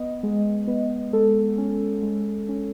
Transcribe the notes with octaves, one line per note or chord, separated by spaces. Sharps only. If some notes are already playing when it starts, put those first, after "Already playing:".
Already playing: B3 D#5
G#3
B3
G#3 A4
C#4
G#3
C#4